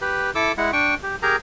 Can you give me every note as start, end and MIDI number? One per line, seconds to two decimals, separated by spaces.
0.01 0.31 67
0.01 0.31 71
0.35 0.52 64
0.35 0.52 69
0.35 0.52 86
0.35 0.52 88
0.58 0.71 56
0.58 0.71 64
0.58 0.71 78
0.73 0.95 62
0.73 0.95 79
0.73 0.95 85
1.03 1.16 67
1.22 1.36 67
1.22 1.36 68
1.22 1.36 70
1.22 1.36 82